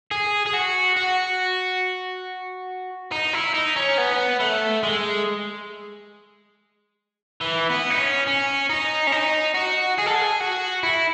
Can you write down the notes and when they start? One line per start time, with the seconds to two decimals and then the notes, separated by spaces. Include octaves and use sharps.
0.11 G#4
0.46 G#4
0.54 F#4
0.96 F#4
3.12 D#4
3.33 E4
3.54 D#4
3.76 C#4
3.98 B3
4.40 A3
4.83 G#3
7.41 E3
7.70 B3
7.90 D#4
7.98 C#4
8.26 C#4
8.69 D#4
9.07 C#4
9.12 D#4
9.55 F#4
9.99 G#4
10.06 A4
10.16 G#4
10.40 F#4
10.83 E4